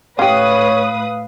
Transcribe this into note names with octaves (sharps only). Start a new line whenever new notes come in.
A2 C#4 G4 B4 C#5 F5 D#6